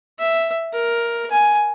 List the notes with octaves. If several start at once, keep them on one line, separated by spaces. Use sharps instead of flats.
E5
A#4
G#5